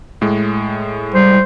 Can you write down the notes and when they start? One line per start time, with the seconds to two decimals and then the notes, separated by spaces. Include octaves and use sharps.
0.21 A2 G#3
1.14 G3 C5